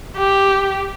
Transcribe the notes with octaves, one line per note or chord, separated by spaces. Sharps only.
G4